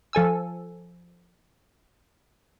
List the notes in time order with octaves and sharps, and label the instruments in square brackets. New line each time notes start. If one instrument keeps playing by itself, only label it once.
[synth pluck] F3 A4 G#5 E6